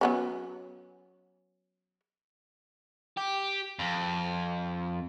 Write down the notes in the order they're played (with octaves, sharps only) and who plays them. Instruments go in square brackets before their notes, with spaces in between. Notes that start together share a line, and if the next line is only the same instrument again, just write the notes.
[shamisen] F#3 B3 C#4
[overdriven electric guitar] G4
F2